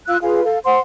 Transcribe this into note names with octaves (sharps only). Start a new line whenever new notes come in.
F4 F5 E6 F#6
F4 G#4 B4 F5
A4 F5
C5 F#5 C6